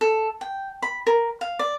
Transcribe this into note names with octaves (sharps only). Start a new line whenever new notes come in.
A4
G5
B5
A#4
F5
D5